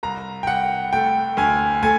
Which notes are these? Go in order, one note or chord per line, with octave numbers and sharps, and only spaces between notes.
C2 A#5
G5
C2 F#5
A3 G5
D2 G#5
A3 G#5